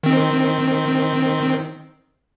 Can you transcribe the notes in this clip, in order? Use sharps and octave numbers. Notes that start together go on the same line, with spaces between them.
D#3 C4